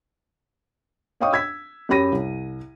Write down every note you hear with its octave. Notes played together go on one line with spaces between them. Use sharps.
C#5 D#5 F5 G5 C#6 D#6
E6 G#6 B6
F#2 G4 C#5 B5 A#6 D#7
C2